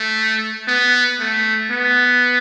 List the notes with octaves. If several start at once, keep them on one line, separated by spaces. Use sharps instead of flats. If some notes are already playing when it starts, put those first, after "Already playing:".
Already playing: A3
B3
A3
B3